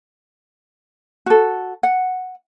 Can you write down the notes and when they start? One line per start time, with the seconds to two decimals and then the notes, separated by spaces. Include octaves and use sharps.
1.26 F#4 A4
1.83 F#5